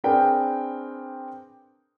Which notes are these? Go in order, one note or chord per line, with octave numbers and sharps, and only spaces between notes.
C4 D4 G#4 A#4 B4 G5